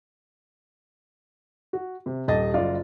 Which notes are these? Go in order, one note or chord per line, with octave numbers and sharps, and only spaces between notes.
F#4
C3
D#1 G4 D#5 A5 A6
F#1 F4 D5 D#5